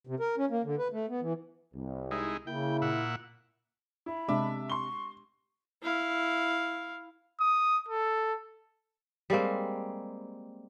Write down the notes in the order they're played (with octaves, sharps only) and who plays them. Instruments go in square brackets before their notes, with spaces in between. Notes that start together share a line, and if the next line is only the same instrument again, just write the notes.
[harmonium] C3
A#4
C#4
A#3
D3
B4
A3
B3
E3
[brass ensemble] C2
[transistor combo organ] G#3 D#4 E4
[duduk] C#3 [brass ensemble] A#3 E4 [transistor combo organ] G5
[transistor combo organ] A#2 E5 F#5
[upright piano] E4 [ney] B5
[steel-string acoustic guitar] C3 [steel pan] G#3 D4 [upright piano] E5 D6
[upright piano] C6 G7 [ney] C#6
[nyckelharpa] E4 F5
[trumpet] D#6
A4
[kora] G3 G#3 A#3 C4